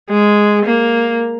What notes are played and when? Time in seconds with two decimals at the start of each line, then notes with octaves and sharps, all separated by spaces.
0.10 G#3
0.65 A#3